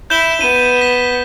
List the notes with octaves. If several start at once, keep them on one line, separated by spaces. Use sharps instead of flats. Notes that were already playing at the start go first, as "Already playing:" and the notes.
E4 G6 E7 G7
B3 D#7
B6